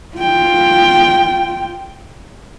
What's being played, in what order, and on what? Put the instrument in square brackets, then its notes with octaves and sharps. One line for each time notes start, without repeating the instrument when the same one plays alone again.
[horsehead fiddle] F4 G5